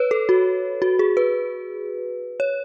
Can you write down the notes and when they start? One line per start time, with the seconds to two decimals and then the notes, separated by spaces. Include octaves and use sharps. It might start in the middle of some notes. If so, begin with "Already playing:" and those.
Already playing: B4 C#5
0.11 A4
0.29 F#4
0.82 F#4
0.99 G#4
1.17 B4
2.40 C#5